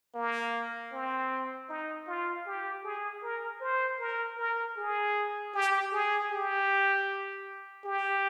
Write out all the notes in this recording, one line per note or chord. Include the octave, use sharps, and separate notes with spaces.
A#3
C4
D#4
F4
G4
G#4
A#4
C5
A#4
A#4
G#4
G4
G#4
G4
G4